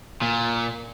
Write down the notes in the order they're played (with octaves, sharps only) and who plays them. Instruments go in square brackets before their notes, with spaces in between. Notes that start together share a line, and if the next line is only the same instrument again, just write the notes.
[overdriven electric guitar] A#2